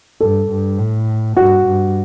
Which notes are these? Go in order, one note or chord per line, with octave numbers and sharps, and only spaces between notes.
G2 A4
G2
A2
G2 F#4
G2